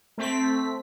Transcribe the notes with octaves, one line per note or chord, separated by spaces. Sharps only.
A3 C4 B6